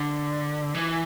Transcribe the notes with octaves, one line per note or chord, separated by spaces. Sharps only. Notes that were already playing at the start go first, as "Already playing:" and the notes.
Already playing: D3
E3